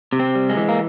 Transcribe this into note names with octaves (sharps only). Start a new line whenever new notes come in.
C3
C4
G3
G#3
E3
A#3